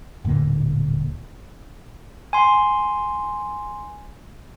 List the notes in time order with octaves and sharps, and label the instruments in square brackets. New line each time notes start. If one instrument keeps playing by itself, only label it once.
[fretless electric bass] D#1 A2 D3 A#3
[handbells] G#5 C6